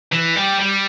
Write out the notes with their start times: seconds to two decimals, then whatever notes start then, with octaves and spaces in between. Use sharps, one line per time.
0.12 E3
0.36 G3
0.60 G3